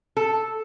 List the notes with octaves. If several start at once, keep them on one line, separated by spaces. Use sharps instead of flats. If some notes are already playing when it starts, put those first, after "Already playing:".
A4